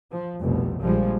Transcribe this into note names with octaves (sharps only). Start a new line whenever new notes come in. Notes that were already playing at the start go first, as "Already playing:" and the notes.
F3
F1 C2 B2
A#1 F3 G3 G#3